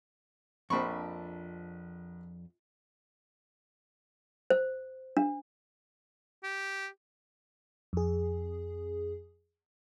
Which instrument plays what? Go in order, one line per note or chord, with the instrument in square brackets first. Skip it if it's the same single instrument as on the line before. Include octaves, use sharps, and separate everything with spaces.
[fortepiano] A#1 B5 C#6 [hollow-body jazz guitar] F2 D4 C5
[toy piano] C5
D4
[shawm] G4
[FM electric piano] F2 G#4